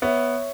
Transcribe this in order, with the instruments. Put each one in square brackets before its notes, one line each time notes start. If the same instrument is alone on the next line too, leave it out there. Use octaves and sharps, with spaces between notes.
[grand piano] B3 [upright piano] C#5 E5